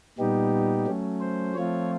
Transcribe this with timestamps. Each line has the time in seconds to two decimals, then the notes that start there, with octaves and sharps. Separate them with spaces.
0.19 A#2 G3 B3 D#4 G4
0.87 F#3 A3 C#4
1.21 C5
1.55 F3 A3 C4 F4 C#5